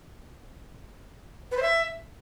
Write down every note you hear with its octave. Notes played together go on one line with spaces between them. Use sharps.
B4
C5
E5